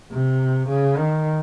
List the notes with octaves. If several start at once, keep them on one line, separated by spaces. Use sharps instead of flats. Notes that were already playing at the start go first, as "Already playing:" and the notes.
C3
C#3
D#3